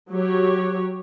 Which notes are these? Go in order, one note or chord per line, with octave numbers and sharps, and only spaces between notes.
F#3 G4 C#5